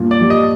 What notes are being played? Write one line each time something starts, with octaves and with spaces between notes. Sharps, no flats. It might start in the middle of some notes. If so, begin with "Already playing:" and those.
Already playing: G2 A#2
D5
G3
D#5